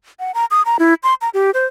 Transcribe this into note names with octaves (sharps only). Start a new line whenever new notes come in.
F#5
A#5
D#6
A#5
E4
C6
A#5
G4
C5